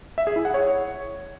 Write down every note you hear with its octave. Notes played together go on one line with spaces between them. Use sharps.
E5
G#4
E4
F#5
C#5